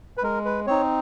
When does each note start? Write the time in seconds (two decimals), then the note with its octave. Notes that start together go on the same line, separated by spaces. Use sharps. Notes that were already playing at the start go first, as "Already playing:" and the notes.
0.17 B4
0.23 G#3 A#4
0.45 B4
0.67 C4 D#4 C#5